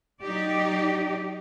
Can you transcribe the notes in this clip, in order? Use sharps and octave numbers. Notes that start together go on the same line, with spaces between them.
F#3 D#4 G4 D5